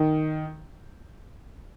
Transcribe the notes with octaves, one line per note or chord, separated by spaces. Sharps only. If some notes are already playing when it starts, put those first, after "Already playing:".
Already playing: D#3